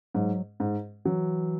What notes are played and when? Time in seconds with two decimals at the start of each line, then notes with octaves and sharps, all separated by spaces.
0.15 G#2 F#3
0.60 G#2
1.05 E3 F#3